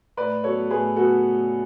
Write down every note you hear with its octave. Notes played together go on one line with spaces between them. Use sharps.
A2 B4 D5
F#3 B3 A4 C#5
A2 G#4 B4
F#3 B3 F#4 A4